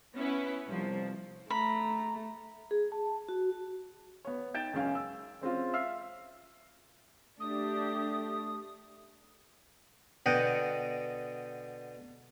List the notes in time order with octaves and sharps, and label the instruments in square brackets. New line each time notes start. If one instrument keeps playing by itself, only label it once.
[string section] B3 C#4 E4 B4
C2 F3
[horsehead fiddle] A3 [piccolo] A#5 [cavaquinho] B5
[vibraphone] G#4
A5
F#4
[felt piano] B3 C#5
D#4 G5 G6 A6 D7 E7
C#2 F#2 C#4 F5 G#5
E6
G#3 C4 C#4 F4
E5 F5 E6 F6 C7
[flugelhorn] A3 [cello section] D4 G4 [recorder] D#6
[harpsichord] B2 D3 D#5 F#5 G5